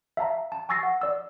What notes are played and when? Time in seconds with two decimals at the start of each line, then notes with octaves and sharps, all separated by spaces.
0.17 E5 F5 A5 A#5
0.52 A5
0.69 G#5 C#6 E6 A6 A#6 C7
0.83 F#5
1.01 D5 E6